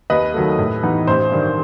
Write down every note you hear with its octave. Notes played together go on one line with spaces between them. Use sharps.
D#2 B4 D#5
D#3 F#3 A3
A2
E3 B3 D#4
A1 C5
G2 D#3